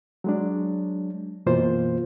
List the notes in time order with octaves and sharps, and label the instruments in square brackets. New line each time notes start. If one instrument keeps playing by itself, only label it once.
[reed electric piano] F#3 G#3 D4
F#2 B2 E3 A#3 F4 C5